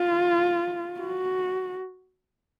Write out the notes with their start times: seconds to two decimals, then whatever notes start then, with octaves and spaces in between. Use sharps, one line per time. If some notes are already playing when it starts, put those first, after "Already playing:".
Already playing: F4
1.01 F#4